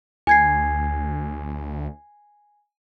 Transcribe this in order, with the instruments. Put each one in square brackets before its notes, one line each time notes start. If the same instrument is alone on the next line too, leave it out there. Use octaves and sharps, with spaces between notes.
[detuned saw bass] D2 [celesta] G#5 G#6 C7